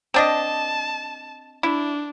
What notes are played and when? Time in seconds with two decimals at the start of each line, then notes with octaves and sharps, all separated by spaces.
0.14 C4 D4 D#5 A5
1.63 D4 E4